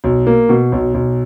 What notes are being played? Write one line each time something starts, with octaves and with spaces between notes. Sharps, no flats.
B1
A#3
B2
B1
B1